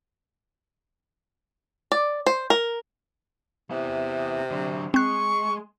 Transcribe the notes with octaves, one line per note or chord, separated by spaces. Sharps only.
D5
C5
A#4
C3 B3 E4
D3 F#3
G#3 C4 C#6 F#6